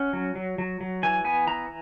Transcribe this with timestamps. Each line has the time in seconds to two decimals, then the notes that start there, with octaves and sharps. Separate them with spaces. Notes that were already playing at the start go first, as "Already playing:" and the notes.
Already playing: C#4 F#5
0.13 F#3
0.36 F#3
0.58 F#3
0.81 F#3
1.03 E3 G#5
1.25 B3 G#5
1.47 E3 A#5